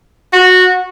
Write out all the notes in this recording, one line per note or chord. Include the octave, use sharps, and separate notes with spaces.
F#4